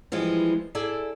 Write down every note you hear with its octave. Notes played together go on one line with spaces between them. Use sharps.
E3 F3 G3 G#3
E4 G#4 A4 D5 E5